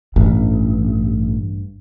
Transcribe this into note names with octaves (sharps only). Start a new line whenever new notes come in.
A1 G2